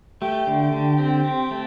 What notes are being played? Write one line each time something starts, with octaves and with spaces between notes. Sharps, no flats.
A3 G4
D3
G4
D3
C4
C4
A3